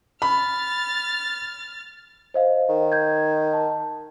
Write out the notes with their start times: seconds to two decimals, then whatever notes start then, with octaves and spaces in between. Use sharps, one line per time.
0.22 B5 F6 A6
2.34 C5 D#5 F5
2.69 D#3
2.92 G6 G#6
3.53 A5